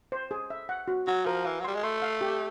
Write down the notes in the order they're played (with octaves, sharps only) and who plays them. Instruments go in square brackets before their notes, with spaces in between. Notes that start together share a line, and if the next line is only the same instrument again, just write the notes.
[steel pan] C5
G#4
E5
F#5
F#4
[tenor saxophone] F#3 [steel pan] F#4
[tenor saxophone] F3 [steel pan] A#4
[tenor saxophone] E3 [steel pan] F5
[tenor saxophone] F#3
[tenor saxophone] G3 [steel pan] C6
[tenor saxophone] G#3
[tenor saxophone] A3 [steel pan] C6
[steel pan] F5
G4